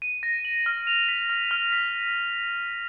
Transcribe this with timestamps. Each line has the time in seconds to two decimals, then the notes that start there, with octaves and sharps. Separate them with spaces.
0.02 D#7
0.23 A#6
0.45 F#7
0.66 F6
0.87 F7
1.09 B6
1.29 F6
1.51 F6
1.72 B6